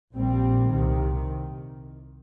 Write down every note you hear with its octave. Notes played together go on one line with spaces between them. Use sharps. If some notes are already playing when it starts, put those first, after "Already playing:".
A#1 A#2 G3 C4
C2 C3 D#3